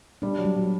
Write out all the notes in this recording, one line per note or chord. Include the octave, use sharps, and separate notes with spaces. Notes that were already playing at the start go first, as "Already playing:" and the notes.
G3 D4
F#3
G3
F#3